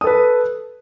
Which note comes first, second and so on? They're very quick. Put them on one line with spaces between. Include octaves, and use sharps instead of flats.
D#6 A4 B4